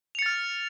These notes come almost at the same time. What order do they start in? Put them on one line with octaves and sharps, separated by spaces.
F7 C#7 A6 F6